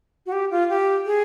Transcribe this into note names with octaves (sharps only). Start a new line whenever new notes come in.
F#4
G4
F4
G4
G#4